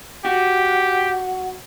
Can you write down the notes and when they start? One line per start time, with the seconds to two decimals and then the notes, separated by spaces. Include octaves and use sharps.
0.25 F#4 G4